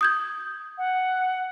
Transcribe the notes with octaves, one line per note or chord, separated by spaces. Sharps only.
D#6 G6 G#6
F#5